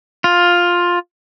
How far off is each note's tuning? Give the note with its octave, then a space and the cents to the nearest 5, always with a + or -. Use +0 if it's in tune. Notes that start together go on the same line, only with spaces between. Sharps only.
F4 +10